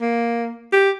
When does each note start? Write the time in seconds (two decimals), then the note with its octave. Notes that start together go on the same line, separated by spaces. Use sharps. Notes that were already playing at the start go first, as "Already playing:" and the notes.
0.01 A#3
0.72 G4